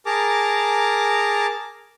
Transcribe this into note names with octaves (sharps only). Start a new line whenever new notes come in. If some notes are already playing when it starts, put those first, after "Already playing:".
G#4 A#4 A5 A#5 D6